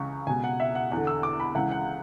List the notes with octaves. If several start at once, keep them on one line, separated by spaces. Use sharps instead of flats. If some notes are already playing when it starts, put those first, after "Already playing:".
Already playing: C#2 C#3 E3 C#6
C#2 B2 G#5
F#5
E5
F#5
E2 D3 F#5
E6
D6
B5
C#2 C#3 E3 F#5
F#5